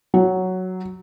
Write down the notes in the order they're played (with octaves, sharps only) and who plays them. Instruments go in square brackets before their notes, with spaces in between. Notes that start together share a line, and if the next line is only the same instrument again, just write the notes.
[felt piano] F#3